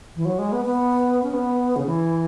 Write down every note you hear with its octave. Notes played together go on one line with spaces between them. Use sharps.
E3
F#3
G#3
B3
B3
C#4
B3
C#3
E3